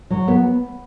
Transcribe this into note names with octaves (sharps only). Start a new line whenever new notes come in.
F#3
B3